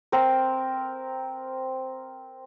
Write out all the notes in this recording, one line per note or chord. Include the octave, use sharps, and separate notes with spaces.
C4 A#4